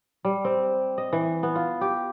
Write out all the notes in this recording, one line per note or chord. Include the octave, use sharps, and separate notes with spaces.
G3
C4
D#5
E3
B3
F4
G4